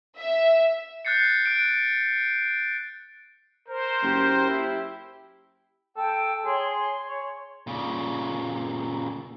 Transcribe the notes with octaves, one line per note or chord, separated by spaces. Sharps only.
E5
F#6 G6 A6 C7 C#7
F#6 D7
A#4 C5
F#1 G4
E4
A4 G5
G#4 C#5 C6
C#5
A#2 C#3